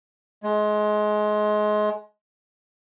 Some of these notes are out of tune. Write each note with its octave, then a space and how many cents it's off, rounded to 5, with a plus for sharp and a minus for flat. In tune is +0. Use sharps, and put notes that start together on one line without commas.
G#3 +25